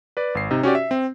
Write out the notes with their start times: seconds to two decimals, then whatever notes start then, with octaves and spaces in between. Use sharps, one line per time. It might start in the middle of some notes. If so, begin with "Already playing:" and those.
0.17 B4 D5
0.35 G#1 C7
0.51 C3 D#4
0.63 C#4 F#4 G4 D5
0.75 E5
0.91 C4